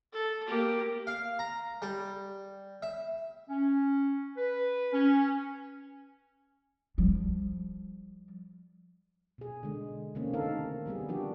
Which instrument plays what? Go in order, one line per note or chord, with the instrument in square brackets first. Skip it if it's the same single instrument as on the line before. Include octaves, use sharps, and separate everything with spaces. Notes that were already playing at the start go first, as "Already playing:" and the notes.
[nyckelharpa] A4
A#3 G4
[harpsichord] F5
A#5
G3
E5
[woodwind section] C#4
B4
C#4
[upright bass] F3 G3
[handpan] B2 G#4
D3 G#3
C3 D#3 A3 A#3 C4 C#4
D3 D#3 D#4 A4 A#4 F5
D#3 G3 B3 G#4
F3 D4 F#4 G4